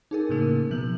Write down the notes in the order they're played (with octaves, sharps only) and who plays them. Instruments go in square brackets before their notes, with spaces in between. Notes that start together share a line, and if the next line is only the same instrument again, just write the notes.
[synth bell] D#4 G#4 A#4
[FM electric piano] A2 C#3 A#3
[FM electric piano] B2 [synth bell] F3 G6 F#7